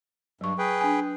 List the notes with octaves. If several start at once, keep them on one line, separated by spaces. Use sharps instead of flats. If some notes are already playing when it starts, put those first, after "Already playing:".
G2 F#3 C#6
G#4 B4 G5
D4 G#5